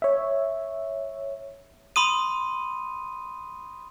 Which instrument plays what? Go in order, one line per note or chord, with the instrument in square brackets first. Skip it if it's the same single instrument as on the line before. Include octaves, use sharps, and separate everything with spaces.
[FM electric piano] C#5 E5
[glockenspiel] B5 C6 D#6 D#7